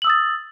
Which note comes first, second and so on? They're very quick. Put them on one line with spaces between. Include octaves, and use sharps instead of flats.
F#7 E6 D#6 A6